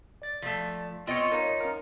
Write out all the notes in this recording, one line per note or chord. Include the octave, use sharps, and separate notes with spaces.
D5 A6
F3 A3
B3 C4 F4 C#5 D#5
D#4 A#4 C#5 F5
C#4 A#4